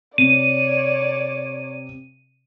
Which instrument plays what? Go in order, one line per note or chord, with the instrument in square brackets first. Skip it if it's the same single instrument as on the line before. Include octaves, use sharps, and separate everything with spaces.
[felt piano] C3 [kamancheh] C#5 D5 [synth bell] D#7